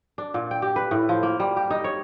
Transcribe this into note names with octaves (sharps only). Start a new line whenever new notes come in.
D4
A#2
G5
G4
B4
A2
F3
A#3
G3
G4
D#4
C#5